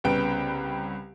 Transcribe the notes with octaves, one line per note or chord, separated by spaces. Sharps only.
C2 C#3 B3 B4 G5 D7